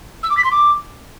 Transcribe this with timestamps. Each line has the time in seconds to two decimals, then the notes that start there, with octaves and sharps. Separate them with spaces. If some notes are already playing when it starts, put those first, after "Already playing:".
0.23 E6
0.30 D6
0.37 B6
0.44 C6
0.51 D6